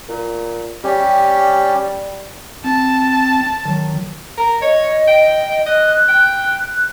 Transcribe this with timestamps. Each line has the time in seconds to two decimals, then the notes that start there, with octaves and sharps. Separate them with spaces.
0.08 A#2
0.84 G3 C#4 G4
2.64 C4 A5
3.66 D#3 F#3
4.38 A#4
4.62 C#5 D#5
5.08 G5
5.66 D#5 F#6
6.09 G5